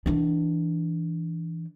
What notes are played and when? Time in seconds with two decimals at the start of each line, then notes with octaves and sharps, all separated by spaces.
0.06 E3 D4